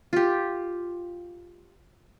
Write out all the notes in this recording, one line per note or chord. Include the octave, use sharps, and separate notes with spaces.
F4 G4